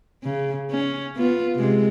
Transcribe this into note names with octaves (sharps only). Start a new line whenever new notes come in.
C#3
C#4
B3 F4
C3 G#3